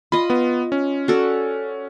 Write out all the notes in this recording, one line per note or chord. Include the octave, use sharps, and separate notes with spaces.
F4 D#5 B5
B3
C#4
F#4 A4 D5